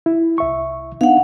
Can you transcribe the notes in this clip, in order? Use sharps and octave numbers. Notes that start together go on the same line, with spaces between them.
E4
C2 E5 C#6
B3 D4 D#4 F5 F#5